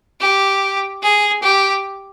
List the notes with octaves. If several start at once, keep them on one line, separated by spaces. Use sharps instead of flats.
G4
G#4
G4